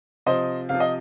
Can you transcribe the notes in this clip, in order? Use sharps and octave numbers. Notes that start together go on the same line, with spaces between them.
C3 F3 C5 D#5
C3 F3 F5
D#5